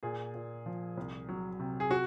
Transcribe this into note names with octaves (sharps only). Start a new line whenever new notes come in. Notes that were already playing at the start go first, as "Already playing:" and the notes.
A#2 G#4
A#2
F3
C2
F#3
C3
G#4
F#4